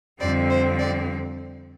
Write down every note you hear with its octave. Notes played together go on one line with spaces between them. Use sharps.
F2 D3 G3 C4 D5
C5
D5